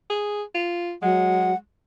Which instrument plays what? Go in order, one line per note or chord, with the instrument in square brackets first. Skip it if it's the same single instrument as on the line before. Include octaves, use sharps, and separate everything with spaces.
[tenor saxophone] G#4
F4
[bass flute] F#3 [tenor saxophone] G#3 [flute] F#5